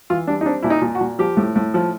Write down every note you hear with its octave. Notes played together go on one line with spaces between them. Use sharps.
E3 F4
G3 D4
D#4
C4 D4
A#2 E4
D#4
A#2
F#4
A#2
F3 G4
A2
A2
F3